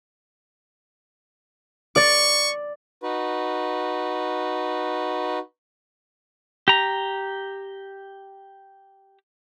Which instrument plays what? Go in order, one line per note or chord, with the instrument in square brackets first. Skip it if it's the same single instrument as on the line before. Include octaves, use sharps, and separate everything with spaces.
[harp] D5 A6 [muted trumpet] C#6
[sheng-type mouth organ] D#4 F#4 B4
[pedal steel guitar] G4 A#5